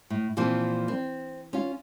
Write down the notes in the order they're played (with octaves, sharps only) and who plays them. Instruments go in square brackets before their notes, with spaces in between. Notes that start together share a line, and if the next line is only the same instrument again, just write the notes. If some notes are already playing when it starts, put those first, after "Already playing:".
[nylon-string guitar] A2
A#2 E3 F3 A#3 C4
C4
C#4 F4